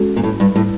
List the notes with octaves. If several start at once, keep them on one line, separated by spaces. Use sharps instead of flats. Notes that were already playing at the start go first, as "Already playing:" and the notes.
Already playing: G#3 C#4 F#4 A4
A#2
A2
G2
A2